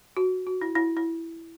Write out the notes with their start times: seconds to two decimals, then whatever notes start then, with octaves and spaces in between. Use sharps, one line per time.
0.17 F#4
0.47 F#4
0.62 E4
0.75 E4
0.97 E4